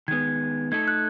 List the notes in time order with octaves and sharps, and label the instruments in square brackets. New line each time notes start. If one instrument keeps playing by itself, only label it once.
[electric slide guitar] D#3 G#3 B3 [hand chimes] G#6
[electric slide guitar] A3 D#4 A4 [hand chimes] G#6
[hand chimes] F#6